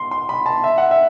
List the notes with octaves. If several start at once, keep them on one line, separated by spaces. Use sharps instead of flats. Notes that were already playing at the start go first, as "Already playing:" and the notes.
Already playing: C6
C6
B5
A5
E5
F#5
E5